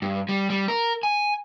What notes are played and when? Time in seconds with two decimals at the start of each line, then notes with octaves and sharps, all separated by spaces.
0.02 G2
0.29 G3
0.50 G3
0.68 A#4
1.03 G#5